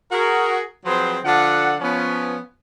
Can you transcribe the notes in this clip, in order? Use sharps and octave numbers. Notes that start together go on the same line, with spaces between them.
F#4 G#4 A#4
F3 F#3 C4 G#4 B4 C5
D3 F3 D4 A4 F#5
F3 B3 C#4